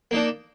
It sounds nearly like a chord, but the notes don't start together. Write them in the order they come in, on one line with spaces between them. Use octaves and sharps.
A#3 D#4 D4